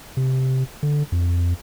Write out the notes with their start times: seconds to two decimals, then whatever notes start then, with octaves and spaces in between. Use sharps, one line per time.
0.17 C3
0.83 D3
1.12 F2